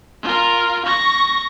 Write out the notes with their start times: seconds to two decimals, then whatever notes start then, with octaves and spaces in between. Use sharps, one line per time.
0.22 F4 A#4
0.85 C#6 A#6